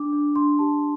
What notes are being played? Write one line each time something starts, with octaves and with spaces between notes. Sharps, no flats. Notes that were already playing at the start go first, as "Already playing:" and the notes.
Already playing: D4 D6
D4
D4 C6
G4 A5